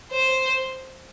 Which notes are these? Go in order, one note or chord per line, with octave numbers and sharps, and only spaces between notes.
C5